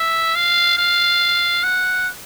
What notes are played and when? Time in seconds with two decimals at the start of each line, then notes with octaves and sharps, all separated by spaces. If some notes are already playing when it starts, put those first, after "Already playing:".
Already playing: E5
0.36 F5
0.78 F5
1.64 F#5